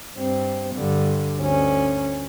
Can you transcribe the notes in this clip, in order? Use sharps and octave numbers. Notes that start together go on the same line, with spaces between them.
G2 C4
G2 D3
D2 C#4